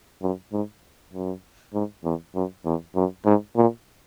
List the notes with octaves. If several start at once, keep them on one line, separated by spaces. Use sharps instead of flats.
F#2
G#2
F#2
G#2
E2
F#2
E2
F#2
G#2
A#2